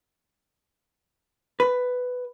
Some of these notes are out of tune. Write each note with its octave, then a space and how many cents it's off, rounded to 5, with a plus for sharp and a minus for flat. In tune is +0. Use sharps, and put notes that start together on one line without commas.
B4 +10